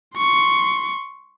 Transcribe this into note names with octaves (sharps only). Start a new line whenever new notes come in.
C6 C#6